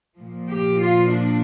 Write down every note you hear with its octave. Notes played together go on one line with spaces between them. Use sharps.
A#2 F3
G4
F4
D4